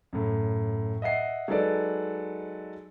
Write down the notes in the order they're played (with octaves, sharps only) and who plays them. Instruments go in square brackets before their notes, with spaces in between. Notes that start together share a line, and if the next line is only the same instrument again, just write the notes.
[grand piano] F#2 A2
D#5 E5 F#5 C7
F#3 G#3 D#4 A4 B4 D5